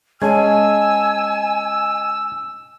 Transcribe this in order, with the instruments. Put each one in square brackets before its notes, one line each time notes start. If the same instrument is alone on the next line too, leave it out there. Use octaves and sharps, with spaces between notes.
[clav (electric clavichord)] G#3 C#4 [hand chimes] D#5 A5 G#6 [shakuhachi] G#5 [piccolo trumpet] E6